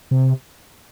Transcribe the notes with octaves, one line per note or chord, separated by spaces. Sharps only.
C3